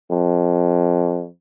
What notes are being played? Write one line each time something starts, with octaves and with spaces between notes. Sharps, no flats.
F2